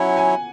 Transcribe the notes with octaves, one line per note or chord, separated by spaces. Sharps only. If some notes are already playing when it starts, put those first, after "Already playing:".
Already playing: F#3 C#4 E4 F#5 G#5
G#5